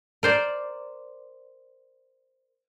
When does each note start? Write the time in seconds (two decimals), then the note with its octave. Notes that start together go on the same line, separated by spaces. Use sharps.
0.23 A#4 C5 D5